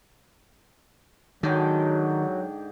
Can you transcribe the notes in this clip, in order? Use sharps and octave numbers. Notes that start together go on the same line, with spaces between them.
G#2 D3 D#3 F#3 G5